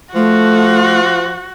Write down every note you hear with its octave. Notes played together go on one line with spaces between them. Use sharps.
F3 A3 F#4